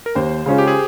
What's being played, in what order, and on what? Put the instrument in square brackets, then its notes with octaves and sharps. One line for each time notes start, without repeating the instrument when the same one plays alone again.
[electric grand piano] A#4
[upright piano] D#2 [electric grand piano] C5
[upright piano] C#3 G#3 C#4 F4
[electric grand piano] G4
G#4